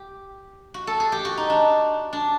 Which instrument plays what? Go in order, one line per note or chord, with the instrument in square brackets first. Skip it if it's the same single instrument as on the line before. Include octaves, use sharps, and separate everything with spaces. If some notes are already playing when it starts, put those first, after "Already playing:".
Already playing: [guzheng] G4
F#4
A4
G#4
G4
F#4
D#4
D4
D4